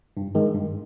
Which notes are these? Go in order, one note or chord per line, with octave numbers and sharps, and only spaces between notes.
G2
D#3 G#3
G2